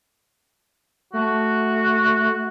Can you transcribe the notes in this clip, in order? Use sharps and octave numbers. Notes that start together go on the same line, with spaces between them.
A3 F#4